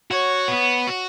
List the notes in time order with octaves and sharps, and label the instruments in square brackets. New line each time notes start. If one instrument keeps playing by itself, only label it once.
[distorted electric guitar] F#4 [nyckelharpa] C#5
[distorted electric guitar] B3
F#4